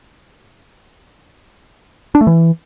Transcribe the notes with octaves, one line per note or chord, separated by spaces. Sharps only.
D4
A3
E3